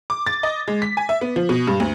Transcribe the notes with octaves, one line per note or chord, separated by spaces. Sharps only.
D6
A6
D#5
G#3
B6
G#5
E5
B3
F3
B2
G2
D2